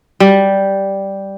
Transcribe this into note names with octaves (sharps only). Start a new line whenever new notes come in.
G3